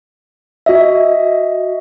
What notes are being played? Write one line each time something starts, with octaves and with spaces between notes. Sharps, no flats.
F#4 D#5 E5